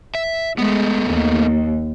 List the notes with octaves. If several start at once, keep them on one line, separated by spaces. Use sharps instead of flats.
E5
G#3 A3 B3
D#2